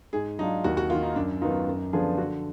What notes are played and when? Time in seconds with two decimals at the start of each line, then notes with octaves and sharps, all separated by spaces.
0.13 G#2 G#4
0.39 F#3 D4 D#4 F4
0.64 D#2 F#4
0.77 F#4
0.90 A#3 F4
0.93 D#3
1.03 D#4
1.16 F#2 D4
1.41 D#3 F#3 B3 D#4 F4
1.67 F#2
1.93 D3 F3 B3 D4 G#4
2.18 D3 F#4